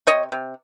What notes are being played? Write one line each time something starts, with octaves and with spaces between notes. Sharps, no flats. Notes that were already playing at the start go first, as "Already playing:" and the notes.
C3 C#5 D#5
C3